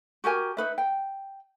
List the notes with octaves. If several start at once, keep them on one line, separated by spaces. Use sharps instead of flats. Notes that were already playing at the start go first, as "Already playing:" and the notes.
F#4 G4 A#4 G#5
D#4 B4 E5
G5